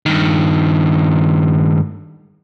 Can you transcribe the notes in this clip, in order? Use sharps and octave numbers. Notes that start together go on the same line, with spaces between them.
G2 D#3